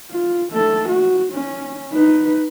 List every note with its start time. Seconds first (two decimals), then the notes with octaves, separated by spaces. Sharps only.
0.11 F4
0.51 A3 A4
0.89 F#4
1.33 C#4
1.93 D#4 B4